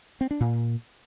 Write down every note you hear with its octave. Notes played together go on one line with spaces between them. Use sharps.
C4
D4
A#2